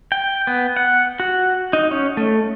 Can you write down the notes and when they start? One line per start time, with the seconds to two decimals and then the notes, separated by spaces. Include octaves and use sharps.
0.12 G5
0.47 B3
0.76 F#5
1.20 F#4
1.73 D#4
1.91 C#4
2.17 A3